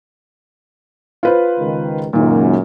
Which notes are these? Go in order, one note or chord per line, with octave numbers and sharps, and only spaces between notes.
F4 B4 C5
C#2 D#3
C#2 F#2 A#2 D#3